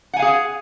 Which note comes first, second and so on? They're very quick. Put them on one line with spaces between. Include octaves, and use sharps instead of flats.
F#5 G#5 F5 G#4